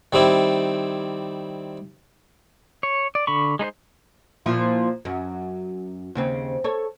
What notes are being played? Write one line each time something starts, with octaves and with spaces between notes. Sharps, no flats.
D#3 G3 C4 E4
C#5
D5
D3 B5 C#6
G#3 D#4 B4 C5
A#2 F3 E4
F#2
D#2 C#3 C4
A4 C#5